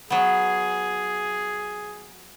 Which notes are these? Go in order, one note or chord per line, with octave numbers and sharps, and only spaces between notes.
F#3 B3 G#4